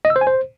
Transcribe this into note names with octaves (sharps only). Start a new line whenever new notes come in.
D#5
E6
C5
G#5
C5